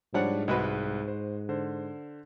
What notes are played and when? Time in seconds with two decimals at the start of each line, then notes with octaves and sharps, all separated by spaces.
0.14 G#2 F3 G3 D4 C#5 F#5
0.48 C2 G#3 F#4 B4
1.08 C5
1.49 D3 C5